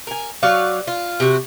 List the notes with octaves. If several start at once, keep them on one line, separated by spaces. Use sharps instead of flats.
A#4 G#5
F#3 C#5 D5 F5
F4
C3 F#4